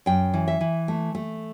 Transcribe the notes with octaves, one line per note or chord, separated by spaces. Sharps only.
F#2 G5
E3
E5
E3
A3
A3